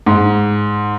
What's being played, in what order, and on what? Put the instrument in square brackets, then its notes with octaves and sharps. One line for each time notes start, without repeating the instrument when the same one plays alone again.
[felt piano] G#2